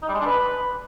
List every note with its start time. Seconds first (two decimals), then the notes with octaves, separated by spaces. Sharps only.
0.03 D#4
0.08 G3
0.14 G#3
0.20 D4
0.26 B4